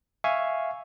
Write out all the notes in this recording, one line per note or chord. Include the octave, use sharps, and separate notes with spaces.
E5 F5 G#5 C#6